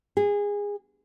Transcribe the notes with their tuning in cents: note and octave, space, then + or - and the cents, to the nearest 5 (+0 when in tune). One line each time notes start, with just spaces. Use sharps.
G#4 -20